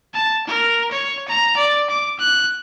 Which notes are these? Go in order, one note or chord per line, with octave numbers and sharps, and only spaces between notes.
A5
A#4
C#5
A#5
D5
D6
F#6